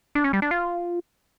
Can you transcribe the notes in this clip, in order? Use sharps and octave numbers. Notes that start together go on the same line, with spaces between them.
D4
C#4
G3
D4
F4